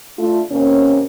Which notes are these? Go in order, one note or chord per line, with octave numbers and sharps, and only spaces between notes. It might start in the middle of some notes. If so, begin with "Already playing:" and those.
A3 D4 F4
D#2 C3 A#3 C#4